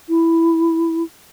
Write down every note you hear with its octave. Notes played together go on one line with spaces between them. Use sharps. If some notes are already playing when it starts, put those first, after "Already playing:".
E4